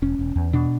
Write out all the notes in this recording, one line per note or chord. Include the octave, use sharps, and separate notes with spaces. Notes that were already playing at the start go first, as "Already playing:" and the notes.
E1 C#4
E1
E2
B2 D4